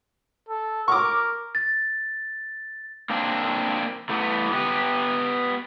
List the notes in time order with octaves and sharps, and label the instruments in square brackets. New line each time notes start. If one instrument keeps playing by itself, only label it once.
[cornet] A4
[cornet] A#4 [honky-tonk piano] C#6 D6
[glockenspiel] A6
[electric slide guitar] A#3 C4 D4
E3 A3 B3
B3 G4